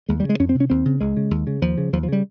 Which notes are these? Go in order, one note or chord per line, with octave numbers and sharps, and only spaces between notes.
D#2 G#3
G3
C#3
G#3
F2 C#4
C4
C3
C#4
D#2 C4
C#3
C#2 G#3
C#3
D#2
C#3
D#2 F3
C#3
D#2 F3
F3
C#3 G3